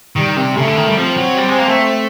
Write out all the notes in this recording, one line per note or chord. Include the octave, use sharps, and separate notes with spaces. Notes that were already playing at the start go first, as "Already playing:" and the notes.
D#3 G3
C3
C#3 A3
D3
D#3
G3
F3 C4
F#3
G3
G#3
A#3
A3